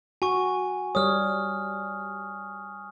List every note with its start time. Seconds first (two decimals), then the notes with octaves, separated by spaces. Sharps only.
0.22 F#4 G#5 C#6
0.95 G3 C#5 D#6 F6